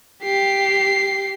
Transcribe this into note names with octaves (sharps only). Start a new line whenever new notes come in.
G4 C7